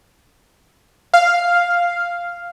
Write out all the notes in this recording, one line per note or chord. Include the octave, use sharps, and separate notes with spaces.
F5